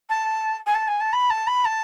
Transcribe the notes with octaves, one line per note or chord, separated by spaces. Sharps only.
A5
G#5
A5
G#5
A5
B5
A5
B5
A5